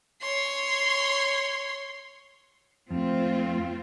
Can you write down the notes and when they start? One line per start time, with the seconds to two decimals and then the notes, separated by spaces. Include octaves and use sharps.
0.22 C#5 C6
2.91 F2 A3 C4 F4